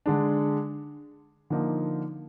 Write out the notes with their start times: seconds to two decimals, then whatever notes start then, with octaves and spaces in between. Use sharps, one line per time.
0.06 D3 G#3 D4
1.50 D3 F3 A#3 D#4